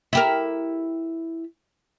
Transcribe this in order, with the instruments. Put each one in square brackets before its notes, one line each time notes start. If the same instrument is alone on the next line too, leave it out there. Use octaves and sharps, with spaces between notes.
[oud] E4 G4 A#4